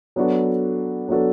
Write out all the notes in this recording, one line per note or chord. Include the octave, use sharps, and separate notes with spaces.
F#3 B3 D4 F#4 A4
F#3 B3 D4 F#4 A4